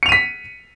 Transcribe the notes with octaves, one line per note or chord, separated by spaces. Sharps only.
B6 C#7 D#7 F7